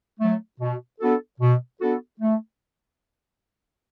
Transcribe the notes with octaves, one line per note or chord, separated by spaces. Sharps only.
F#3 A3
B2
B3 D4 F#4 A4
B2
B3 D4 F#4 A4
A3